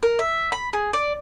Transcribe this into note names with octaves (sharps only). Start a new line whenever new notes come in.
A#4
E5
B5
G#4
D5